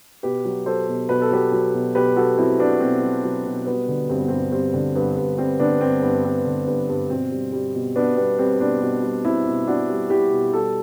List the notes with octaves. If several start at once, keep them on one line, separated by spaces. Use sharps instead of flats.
B2 G4 B4
F#3
F#3 A4 C5
B2
B2 B4
A4
F#3 G4 B4
F#3
B2
B2 G4 B4
F#3 F#4 A4
F#3 C4 E4
B2 B3 D4
B2 C4
F#3
F#3
B2
G3 B3
D3
G2 C4
B3
G2 C4
G3 C4
D3
G2 B3
G2
G3 C4
D3 B3 D4
G2 C4
G2 B3
G3 C4
D3
G2 B3
G2
B2 C4
G3
G3
B2
B2 B3 D4
G3 B3
G3 C4
B2 B3 D4
B2
G3
G3 C4 E4
B2
B2 D4 F#4
G3
G3 E4 G4
B2
G3 F#4 A4